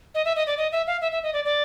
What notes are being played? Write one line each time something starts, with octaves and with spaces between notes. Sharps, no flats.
D#5
E5
D#5
D5
D#5
E5
F5
E5
E5
D#5
D5
D5